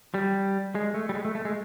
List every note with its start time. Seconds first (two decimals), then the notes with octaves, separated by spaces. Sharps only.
0.14 G3
0.75 G#3
0.94 A3
1.09 G3
1.15 G#3
1.25 A3
1.35 A3
1.45 G#3